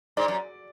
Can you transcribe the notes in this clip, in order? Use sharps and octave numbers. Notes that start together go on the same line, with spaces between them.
G#2 D5
F#2